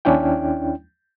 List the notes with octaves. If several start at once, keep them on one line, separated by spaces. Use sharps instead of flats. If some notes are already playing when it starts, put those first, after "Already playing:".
D#2 C#4 D4 E4 G5